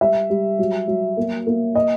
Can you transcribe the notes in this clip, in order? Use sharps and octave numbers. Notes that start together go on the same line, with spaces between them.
G3 E5
G3
F#3
F#3
A#3
A#3
D#5